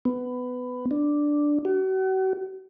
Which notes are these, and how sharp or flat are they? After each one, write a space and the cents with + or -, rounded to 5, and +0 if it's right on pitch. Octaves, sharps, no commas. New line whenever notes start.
B3 +15
D4 +0
F#4 +40